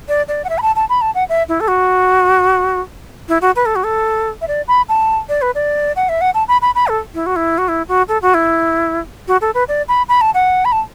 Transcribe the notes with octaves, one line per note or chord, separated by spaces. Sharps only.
D5
D5
F#5
E5
B5
A5
A5
B5
A5
F#5
E5
E4
A4
F#4
E4
F#4
B4
A4
F#4
A4
E5
D5
B5
A5
D5
B4
D5
F#5
E5
F#5
A5
B5
B5
B5
A4
E4
F#4
E4
F#4
E4
F#4
A4
F#4
E4
F#4
A4
B4
D5
B5
B5
A5
F#5
B5
A5